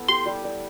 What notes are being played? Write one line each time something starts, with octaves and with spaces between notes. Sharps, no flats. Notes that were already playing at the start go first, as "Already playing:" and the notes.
Already playing: B3 E4 A4
G4 C6
G3
D5